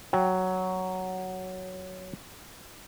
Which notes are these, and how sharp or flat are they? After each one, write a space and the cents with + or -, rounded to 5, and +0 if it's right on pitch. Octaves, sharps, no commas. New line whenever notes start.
F#3 +5 G5 +0